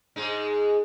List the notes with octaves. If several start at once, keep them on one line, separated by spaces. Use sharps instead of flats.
G#2 G#3 D#4